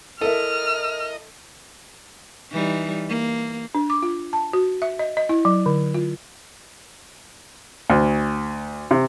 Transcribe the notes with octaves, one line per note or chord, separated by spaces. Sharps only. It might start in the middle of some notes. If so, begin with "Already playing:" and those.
E4 A4 A#4 D#5 E5 F6
E3 G3 D#4
A#3
D4
D6
F4
A5
F#4
E5
D#5
D#5
E4
F#3
D3
F4
D2
C3